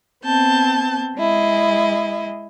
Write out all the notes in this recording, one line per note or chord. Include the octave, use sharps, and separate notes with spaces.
B3 C4 A5 G6
G#3 E4 D#5